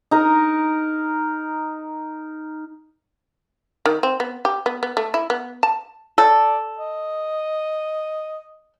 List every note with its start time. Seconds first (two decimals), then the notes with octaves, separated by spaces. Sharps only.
0.11 D#4 A#4
3.86 D#3
4.03 C4
4.20 B3
4.45 G4
4.66 B3
4.83 B3
4.97 A3
5.14 E4
5.30 B3
5.63 A5
6.18 A4 D5
6.79 D#5